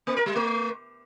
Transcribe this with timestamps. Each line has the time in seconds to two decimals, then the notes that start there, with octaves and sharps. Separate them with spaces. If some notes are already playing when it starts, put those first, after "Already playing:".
0.07 A#3
0.16 A#4
0.26 G3
0.36 A3